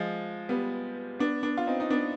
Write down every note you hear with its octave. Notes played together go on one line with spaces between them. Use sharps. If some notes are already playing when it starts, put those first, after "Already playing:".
Already playing: F3 G#3
G3 B3
B3 D4
B3 D4
F4
C4 D#4
D#4
B3 D4